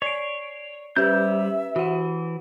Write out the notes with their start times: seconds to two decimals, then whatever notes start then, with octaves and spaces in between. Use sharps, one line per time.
0.02 C#5 D5 C7 D7
0.96 G3 C#4 G4 B4 C5 E5 G6
1.76 E3 F#4 F#5